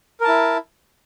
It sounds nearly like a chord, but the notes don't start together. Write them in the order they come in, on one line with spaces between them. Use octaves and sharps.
A#4 A5 E4